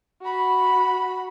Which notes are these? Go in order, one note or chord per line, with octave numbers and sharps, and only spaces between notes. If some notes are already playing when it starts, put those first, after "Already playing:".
F#4 B5